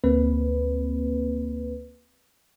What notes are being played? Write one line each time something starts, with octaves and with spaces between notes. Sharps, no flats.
D2 A#3 C4 B4